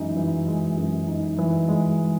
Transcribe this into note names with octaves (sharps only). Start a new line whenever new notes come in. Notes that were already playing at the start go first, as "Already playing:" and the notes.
Already playing: F#2 E3 G#3 D#4
E3
G#3
F#2
D#4
E3
G#3